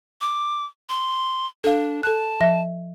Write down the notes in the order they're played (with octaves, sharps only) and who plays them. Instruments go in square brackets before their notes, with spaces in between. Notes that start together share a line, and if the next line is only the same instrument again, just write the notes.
[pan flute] D6
C6
[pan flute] D4 [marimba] A4 F5
[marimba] A4 F#6 [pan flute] A5
[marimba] F3 E5 A#6